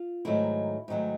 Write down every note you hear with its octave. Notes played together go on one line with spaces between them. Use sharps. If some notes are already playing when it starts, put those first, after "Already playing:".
Already playing: F4
G#2 D#3 F#3 A3 E4
G#2 D#3 F#3 A3